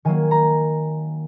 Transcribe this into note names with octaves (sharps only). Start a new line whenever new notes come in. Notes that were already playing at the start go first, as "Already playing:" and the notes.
D#3 F#3 A#3 G#5
A#5